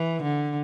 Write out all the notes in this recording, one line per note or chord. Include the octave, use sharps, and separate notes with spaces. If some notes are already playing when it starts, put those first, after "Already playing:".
Already playing: E3
D3